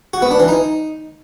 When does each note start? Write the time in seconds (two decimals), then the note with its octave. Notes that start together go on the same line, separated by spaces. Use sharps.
0.14 F#4
0.22 B3
0.31 D4
0.40 E3
0.48 D#4